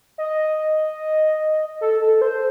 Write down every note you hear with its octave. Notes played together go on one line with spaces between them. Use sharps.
D#5
A4
A4
C5